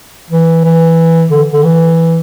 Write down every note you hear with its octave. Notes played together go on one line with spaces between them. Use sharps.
E3
E3
D3
D3
E3